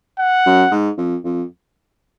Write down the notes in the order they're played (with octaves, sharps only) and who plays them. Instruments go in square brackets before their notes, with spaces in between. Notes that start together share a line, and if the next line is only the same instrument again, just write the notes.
[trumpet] F#5
[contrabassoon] F#2
G#2
F2
F2